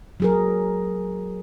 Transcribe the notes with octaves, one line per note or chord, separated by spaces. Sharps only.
F#3 G#4 A#4